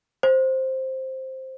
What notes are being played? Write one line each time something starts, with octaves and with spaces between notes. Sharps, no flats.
C5